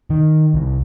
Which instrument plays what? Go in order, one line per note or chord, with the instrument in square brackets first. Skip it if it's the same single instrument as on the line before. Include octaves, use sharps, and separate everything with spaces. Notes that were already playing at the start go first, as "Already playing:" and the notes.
[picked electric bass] D#3
C2